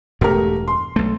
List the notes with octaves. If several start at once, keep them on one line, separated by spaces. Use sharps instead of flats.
E1 G2 A3 G4 A#4
C6
B1 A3